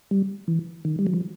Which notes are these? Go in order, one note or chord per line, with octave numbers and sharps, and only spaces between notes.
G3
E3
D#3
G3
F#3
F3